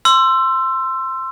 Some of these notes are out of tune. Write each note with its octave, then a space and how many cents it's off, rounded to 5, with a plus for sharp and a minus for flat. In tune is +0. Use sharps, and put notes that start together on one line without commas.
C6 +0 E6 +25